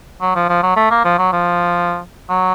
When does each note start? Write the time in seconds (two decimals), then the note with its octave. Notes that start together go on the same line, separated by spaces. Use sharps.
0.22 F#3
0.35 F3
0.49 F3
0.63 F#3
0.76 A3
0.91 A#3
1.05 F3
1.18 F#3
1.32 F3
2.29 F#3